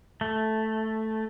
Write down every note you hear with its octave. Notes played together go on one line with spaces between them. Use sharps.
A3